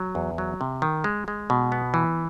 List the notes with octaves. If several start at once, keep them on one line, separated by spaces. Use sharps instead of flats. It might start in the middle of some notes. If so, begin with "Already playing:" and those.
Already playing: F#3
E2
F#3
C3
D#3
G#3
G#3
B2
B3
E3